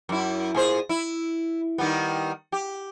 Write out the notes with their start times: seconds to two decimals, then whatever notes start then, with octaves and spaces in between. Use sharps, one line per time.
0.09 F#2 E4
0.55 A#2 G#4 C5
0.89 E4
1.78 D#3 G3 B3
2.52 G4